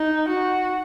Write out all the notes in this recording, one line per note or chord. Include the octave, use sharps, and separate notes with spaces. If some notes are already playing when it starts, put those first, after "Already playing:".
Already playing: D#4
F#4